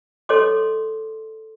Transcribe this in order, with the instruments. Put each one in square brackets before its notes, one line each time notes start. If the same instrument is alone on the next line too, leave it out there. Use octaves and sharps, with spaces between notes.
[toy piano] A4 C#5 D#5 C6 D6